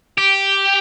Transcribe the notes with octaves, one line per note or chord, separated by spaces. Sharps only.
G4